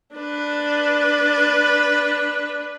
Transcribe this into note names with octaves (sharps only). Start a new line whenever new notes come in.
D4 B4